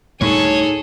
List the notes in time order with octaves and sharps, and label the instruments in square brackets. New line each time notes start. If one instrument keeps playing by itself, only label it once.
[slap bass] D2 A2 G3 [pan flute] D#4 [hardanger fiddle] G#4 A4 [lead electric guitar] C#5